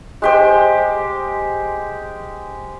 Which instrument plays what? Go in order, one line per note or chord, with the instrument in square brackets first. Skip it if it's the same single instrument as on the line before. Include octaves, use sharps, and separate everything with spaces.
[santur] G#3 G4 C5